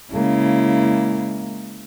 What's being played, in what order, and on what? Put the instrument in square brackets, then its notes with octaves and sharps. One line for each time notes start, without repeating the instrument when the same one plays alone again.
[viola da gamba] C#3 E4 [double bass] G#3 A#3